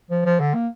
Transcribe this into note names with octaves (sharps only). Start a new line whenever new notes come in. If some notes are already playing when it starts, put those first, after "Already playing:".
F3
F3
D3
A#3